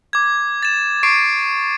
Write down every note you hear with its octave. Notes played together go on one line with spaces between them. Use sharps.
D6 G#6
A6 E7
C#6 D6 C7 D7